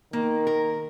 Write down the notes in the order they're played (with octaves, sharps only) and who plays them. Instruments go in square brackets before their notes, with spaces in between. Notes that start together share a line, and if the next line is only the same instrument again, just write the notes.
[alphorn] D#3 [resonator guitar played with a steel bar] A#3
[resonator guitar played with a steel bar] A#4